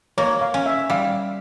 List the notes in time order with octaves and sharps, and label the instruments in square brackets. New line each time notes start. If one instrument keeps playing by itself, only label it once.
[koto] A#3 [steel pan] C#5
[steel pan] F5
[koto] C#4
[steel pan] E5
[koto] G3 [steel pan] F5